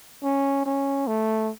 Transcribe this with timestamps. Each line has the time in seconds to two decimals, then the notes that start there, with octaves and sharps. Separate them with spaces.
0.24 C#4
0.66 C#4
1.07 A3